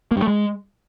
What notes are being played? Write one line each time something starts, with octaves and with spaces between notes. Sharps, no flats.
A#3
G2
A3
G#3